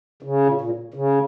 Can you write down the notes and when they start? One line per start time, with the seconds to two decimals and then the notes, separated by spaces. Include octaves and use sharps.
0.23 C#3
0.46 A#2
0.61 A#2
0.94 C#3